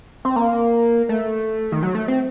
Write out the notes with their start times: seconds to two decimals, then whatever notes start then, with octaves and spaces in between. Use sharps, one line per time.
0.25 C4
0.36 A#3
1.09 A3
1.72 D#3
1.83 F#3
1.95 A3
2.08 C4